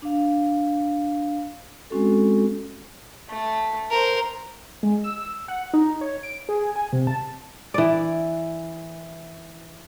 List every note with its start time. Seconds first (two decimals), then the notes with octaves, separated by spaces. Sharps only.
0.02 D4 F5
1.90 G#3 C4 C#4 F#4 A4
3.30 A3
3.90 A#4 C5
4.83 G#3
5.04 E6
5.48 F#5
5.74 D#4
6.01 C#5
6.23 D7
6.49 G#4
6.76 G#5
6.93 C3
7.07 A5
7.74 E3 D5